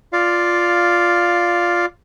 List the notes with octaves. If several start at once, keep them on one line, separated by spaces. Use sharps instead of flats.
F4 D5 F5